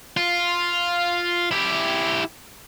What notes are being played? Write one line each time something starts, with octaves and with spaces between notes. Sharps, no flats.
F4
E4 G4